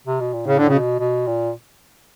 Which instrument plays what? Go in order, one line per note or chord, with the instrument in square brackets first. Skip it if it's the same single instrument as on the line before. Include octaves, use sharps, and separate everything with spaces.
[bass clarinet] C3
B2
A#2
[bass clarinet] A2 [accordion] C#3
[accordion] D3
C#3
[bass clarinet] B2
B2
A#2